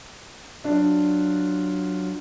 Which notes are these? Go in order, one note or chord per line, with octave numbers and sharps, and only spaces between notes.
F#3 D4 F4